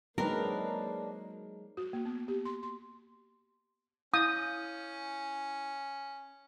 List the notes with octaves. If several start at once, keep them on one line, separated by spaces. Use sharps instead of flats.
F#3 G#3 A#3 C4 D4 D#4 A#4 B4
F#4
A#3
B3
G4
C6
C6
C#4 E4 F5 D#6 G6